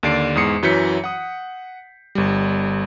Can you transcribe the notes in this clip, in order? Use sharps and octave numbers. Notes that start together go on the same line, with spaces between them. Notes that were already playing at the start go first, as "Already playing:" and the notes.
D#2 D3 D5 C7 D7
E2 G#2 D#6 C7 C#7
F#2 E3 F#3 G6 B6 C#7
F#5 D#6
G1 G3